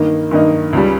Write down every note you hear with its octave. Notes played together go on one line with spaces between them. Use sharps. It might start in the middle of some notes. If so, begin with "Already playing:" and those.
Already playing: G2 D#3 A#3 D#4
G2 D#3 A#3 D#4
C#2 C#3 G3